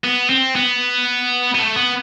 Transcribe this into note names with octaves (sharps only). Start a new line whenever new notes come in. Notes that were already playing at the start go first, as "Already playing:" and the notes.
B3
C4
B3
B3
A3
B3